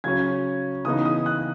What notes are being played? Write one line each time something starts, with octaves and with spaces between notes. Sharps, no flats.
C#3 F#3 C#4 G#6
C#3 E3 B3 D#4 D#6
D#6
F#6